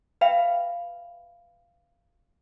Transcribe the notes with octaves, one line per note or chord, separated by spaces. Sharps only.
B4 E5 F5 G5 B5